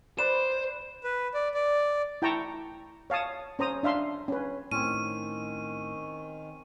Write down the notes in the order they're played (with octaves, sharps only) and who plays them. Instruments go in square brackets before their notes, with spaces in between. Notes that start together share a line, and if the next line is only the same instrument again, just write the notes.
[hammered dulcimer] B4 D5 C6 [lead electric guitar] C5 [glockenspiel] E7
[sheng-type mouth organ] B4
D5
D5
[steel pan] E4 G5 A5 A#5 C#6
C#5 F5 A5 D#6
C#4 C5 A#5 D#6
D4 E5 F5 C6
C#4 B4
[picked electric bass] A2 [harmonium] D#3 [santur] C4 C#4 [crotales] D#7